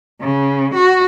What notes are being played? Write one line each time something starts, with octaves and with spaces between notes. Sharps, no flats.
C#3
F#4